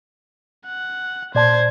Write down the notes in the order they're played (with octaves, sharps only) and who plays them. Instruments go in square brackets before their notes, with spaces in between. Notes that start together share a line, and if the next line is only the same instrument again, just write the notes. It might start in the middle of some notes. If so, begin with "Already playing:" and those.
[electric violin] F#5
[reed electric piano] A#2 D5 A5 [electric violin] C5 G#6